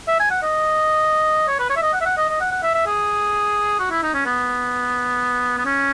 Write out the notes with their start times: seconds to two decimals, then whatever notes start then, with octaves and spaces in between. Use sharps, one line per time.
0.08 E5
0.20 G#5
0.31 F#5
0.43 D#5
1.48 C#5
1.59 B4
1.70 C#5
1.77 E5
1.82 D#5
1.94 F#5
2.01 E5
2.06 F#5
2.17 D#5
2.29 D#5
2.41 F#5
2.51 F#5
2.63 E5
2.75 E5
2.87 G#4
3.80 F#4
3.91 E4
4.03 D#4
4.14 C#4
4.26 B3
5.58 B3
5.65 C#4